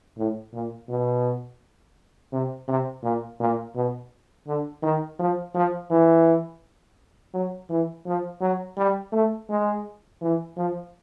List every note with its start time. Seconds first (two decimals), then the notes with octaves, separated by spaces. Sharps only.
0.18 A2
0.53 A#2
0.89 B2
2.33 C3
2.68 C3
3.04 A#2
3.40 A#2
3.76 B2
4.47 D3
4.83 D#3
5.19 F3
5.55 F3
5.91 E3
7.34 F#3
7.70 E3
8.07 F3
8.41 F#3
8.77 G3
9.13 A3
9.50 G#3
10.22 E3
10.57 F3